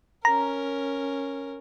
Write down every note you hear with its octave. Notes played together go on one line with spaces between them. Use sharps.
C#4 A#4 A#5